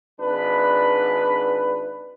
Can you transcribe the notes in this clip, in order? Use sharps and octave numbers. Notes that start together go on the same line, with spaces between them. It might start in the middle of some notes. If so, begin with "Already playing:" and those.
G#1 D4 B4